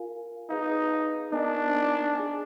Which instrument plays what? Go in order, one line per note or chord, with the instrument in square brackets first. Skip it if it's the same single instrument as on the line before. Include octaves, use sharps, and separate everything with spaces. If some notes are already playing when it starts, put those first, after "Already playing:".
Already playing: [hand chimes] F4 A#4 F5 G#5
[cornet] D#4 [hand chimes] G#4 B4 F5
[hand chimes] B3 D#4 A#4 D#5 G#5 [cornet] D4
[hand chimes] G#4 D5 G#5